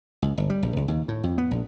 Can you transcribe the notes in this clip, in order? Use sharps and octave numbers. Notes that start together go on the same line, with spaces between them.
C#2
G1
G3
A#1
C#2
D#2
A2
F2
B3
A#1